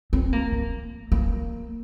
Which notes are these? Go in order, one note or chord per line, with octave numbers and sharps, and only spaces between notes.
C4
A#3
A#3
A#3